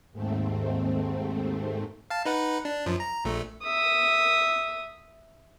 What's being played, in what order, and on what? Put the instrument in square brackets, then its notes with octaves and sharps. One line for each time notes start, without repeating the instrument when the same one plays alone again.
[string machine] D#2 G#2 A3 C4
[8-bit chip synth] F5 A5
D#4 B4 F#5
D4
F#2 F3
A#5
A#1 A3
[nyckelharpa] E5 D#6